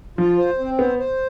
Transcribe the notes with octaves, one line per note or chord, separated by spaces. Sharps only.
F3 F4
C5
C4
B3 C5
C5